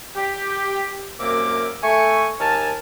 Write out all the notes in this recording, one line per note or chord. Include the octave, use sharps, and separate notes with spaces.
G4
C2 F#2 A#3 A#4 E5 D6
A3 G#5 C#6
D#2 A#4 G#5 A5